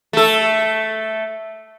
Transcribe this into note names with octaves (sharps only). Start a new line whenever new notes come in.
A3 A4